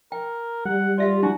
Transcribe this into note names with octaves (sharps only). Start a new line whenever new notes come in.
A#4 G5
G3 F#5
F4 D5 E5 F5
D4 E4 F#4